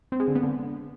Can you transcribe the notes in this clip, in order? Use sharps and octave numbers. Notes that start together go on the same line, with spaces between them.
C4
G#3
D3
B3
D3